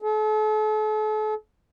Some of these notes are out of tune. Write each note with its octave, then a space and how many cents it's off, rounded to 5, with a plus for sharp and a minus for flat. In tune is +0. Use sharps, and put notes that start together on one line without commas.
A4 -40